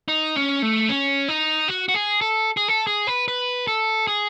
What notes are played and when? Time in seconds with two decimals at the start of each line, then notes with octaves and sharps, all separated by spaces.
0.08 D#4
0.36 C#4
0.62 A3
0.89 C#4
1.28 D#4
1.68 F#4
1.89 F#4
1.94 G#4
2.21 A4
2.57 G#4
2.68 A4
2.87 G#4
3.07 B4
3.28 B4
3.67 A4
4.07 G#4